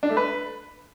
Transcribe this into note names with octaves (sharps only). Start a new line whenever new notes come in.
D4
A3
B4